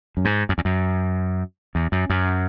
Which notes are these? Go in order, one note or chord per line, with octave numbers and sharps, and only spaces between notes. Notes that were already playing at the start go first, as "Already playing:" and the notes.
F#2
G#2
F#2
E2
F#2
E2
F#2
F#2